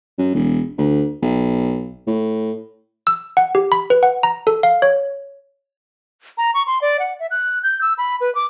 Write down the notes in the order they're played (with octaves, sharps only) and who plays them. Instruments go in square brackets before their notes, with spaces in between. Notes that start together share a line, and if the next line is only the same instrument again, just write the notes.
[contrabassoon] F#2
E1
D2
B1
A2
[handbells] E6
F#5
G4
B5
B4
F#5
A#5
A4
F5
C#5
[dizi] A#5
C#6
C6
D5
F#5
E5
F#6
G6
E6
B5
B4
D6